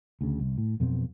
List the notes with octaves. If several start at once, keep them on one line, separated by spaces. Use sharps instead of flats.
D2 C#3
C2
A2
F2 B2 F#3 C4